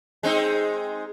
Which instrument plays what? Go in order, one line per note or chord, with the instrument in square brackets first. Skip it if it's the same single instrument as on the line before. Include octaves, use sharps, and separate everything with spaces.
[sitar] G#3 C4 D#4